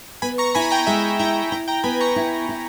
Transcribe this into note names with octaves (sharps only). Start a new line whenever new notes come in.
B3 G#5 B5
A#5 C#6
E4 G#5 B5
G5 A#5
G#3 E5 G#5
E4 G5 A#5
E4 G5 A#5
G5 A#5
B3 G#5 B5
A#5 C#6
E4
E4